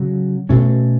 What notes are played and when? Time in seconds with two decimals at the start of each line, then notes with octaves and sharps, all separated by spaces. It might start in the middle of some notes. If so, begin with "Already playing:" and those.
Already playing: C#3 F#3 C#4
0.49 B2 A3 C#4